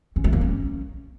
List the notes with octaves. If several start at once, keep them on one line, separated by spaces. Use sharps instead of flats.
C#4
A3
A#3
C#4